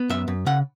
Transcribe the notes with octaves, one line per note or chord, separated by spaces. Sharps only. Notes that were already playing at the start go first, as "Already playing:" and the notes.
Already playing: B3
F#2 E5
F#2
C#3 F#5